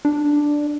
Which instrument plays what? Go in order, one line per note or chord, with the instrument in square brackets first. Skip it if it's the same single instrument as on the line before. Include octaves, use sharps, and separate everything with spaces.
[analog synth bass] D4